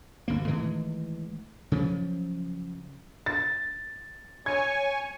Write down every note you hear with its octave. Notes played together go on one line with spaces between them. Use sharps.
G1 D2 A#3
A2 D#3 E3 G#3
C#3 F3 F#3
A6
C#5 G#5 C#6 G#6